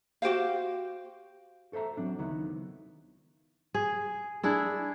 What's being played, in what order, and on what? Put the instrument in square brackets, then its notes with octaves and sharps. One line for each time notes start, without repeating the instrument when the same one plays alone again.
[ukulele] F#4 G4 C5 F5
[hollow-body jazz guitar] F#4 A4 C5 E5 A#5
F#3 C4 D4
C#2 D#3 F#3 B3 E4 A#5
[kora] G#4
D4 E4 G#4